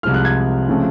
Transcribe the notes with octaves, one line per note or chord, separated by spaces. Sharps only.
C2 C3 F3 G#3 F6
F#6
G#6
C#3 F3 A3 C4